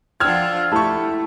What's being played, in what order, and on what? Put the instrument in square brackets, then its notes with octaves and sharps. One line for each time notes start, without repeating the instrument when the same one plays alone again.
[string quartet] F3 D4 F4 [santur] F#5 G5 [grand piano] E6 F6 G#6
[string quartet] A3 [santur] E4 [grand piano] G4 C#6 [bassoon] A4